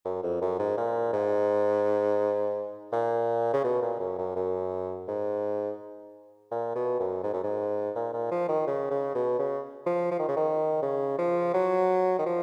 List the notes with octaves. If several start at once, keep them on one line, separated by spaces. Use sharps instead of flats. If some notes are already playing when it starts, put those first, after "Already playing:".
F#2
F2
F#2
G#2
A#2
G#2
A#2
C#3
B2
A#2
F#2
F#2
F#2
G#2
A#2
B2
F#2
G#2
F#2
G#2
A#2
A#2
F3
D#3
C#3
C#3
B2
C#3
F3
F3
D#3
C#3
D#3
C#3
F3
F#3
D#3
F3